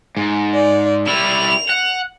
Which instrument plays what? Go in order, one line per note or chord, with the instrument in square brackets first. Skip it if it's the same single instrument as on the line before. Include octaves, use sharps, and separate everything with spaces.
[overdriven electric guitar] G#2
[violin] D5
[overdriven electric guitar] G3 E4 [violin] F7
[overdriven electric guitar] F#5